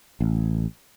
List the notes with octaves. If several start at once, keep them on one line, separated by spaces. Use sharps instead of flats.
A1